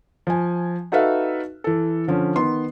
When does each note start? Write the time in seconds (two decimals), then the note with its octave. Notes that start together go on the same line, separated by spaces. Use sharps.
0.27 F3 G#5
0.92 D#4 F#4 A4 B4 E5 F5
1.64 E3 A4
2.08 D3 F3 C#4
2.36 D#3 B3 C6